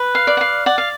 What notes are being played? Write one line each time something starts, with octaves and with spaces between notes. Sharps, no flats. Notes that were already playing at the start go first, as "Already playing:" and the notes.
Already playing: B4
F5
D5
F#5
F5
D5 F#5
F5